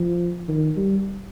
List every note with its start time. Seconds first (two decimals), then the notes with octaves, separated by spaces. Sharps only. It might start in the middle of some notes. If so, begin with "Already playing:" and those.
Already playing: F3
0.48 D#3
0.77 G3